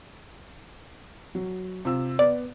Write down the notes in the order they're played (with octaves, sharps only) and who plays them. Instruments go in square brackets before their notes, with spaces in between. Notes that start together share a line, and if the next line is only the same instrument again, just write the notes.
[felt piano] F#3
C3 F4 E6
[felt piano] B3 [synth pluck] D5